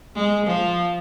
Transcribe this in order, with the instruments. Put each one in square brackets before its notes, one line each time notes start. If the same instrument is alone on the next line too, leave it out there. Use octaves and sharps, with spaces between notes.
[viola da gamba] G#3
F3